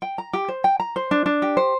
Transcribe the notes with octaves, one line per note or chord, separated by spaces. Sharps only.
G5
A#5
G4
C5
G5
A#5
C5
D4
D4
G4
C5